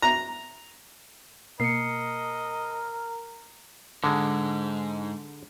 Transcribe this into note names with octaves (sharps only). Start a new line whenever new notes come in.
A#5
B2 A#3 A#4 D#5 C7 C#7
G#2 D3 G#3